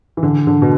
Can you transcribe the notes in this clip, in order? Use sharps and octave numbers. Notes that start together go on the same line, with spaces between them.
E3
D3
D3
B2